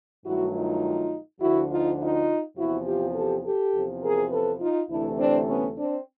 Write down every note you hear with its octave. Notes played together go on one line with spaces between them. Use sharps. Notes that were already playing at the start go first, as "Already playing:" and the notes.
G2 D#3 F#3 A3 E4 F#4
D#4 F4
D2 D3 F3 E4 F#4
D#4 F4
D#4 F4
E2 C3 F3 E4 F#4
F4 G4
G4 A4
G4 A4
E2 C3 F3
G#4 A#4
A4 B4
D#4 F4
D2 C3 E3 A3 D4 E4
C4 D4
B3 C#4
C4 D4